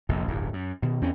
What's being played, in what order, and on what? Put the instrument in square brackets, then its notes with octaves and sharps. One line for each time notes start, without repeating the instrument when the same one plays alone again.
[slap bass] F1 A#1 F2
D1 G1 E2
F#2
B2 D#3
E2 C4 C#4